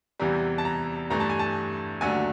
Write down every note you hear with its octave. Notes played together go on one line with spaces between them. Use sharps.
E2 C3 E3 G3 A#5
A5
A#5
G2 E3 A3 A#5
A5
G#5
A5
D#2 D3 F#3 A3 G#5